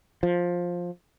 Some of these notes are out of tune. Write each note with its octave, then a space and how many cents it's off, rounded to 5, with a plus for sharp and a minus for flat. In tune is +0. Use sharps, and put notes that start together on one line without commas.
F3 +10